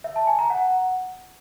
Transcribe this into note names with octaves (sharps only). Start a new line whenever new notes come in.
E5
A5
G#5
A#5
F#5